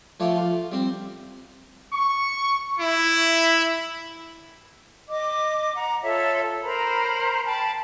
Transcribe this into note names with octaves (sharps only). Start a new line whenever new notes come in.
F3 A3 C#5 D5
F4
G3 C4
C#6
E4
D#5 D6
F#5 A#5
F4 A4 C#5 E5
A#4 C5 A#5 B5
G5 A5 B5